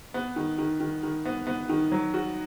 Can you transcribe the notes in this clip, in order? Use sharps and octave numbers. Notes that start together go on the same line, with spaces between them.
B3
D#3
D#3
D#3
D#3
B3
B3
D#3
F#3
F#4